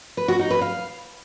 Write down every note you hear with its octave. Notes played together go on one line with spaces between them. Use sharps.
B4
F#4
D#4
B4
F5